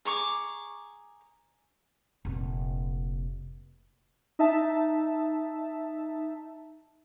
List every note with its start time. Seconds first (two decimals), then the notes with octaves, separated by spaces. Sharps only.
0.05 G#4 A#5 C#6 D6
2.25 F1 A#2
4.39 D#4 E5 A5